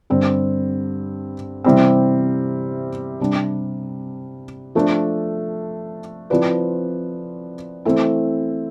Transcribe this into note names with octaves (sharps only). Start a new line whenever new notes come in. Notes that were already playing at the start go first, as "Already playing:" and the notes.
G2 D3 G3 C4
C3 E3 G3 C4
C3 G3 D4
F3 A3 D4 A4
F3 C4 E4 B4 D5
E3 A3 C4 E4